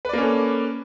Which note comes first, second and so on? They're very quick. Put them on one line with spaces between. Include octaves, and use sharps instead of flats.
B4 D5 A#3 C#4 A4